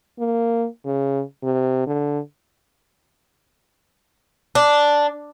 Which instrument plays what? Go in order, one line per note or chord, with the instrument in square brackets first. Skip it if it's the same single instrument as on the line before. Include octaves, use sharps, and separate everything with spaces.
[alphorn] A#3
C#3
C3
D3
[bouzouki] D4